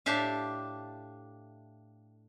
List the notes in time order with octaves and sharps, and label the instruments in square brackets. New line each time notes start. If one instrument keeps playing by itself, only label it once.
[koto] A2 D4 G4 A4 E5 F5